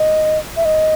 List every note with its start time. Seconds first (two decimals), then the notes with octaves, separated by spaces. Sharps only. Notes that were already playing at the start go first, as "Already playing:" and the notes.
Already playing: D#5
0.57 E5
0.65 D#5